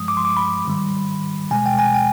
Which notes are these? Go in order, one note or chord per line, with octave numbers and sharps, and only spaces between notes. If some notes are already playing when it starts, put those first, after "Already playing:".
Already playing: G2 F3 G#3 D#6
D6
C6
D6
B5
G#2 D#3 G3
B2 G#3 G#5
G5
G#5
G5